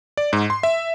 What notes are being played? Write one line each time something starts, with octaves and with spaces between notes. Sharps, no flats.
D5
G#2
C6
E5